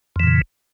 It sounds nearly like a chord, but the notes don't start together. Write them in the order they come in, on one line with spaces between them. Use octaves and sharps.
F2 E3 A#2 C#3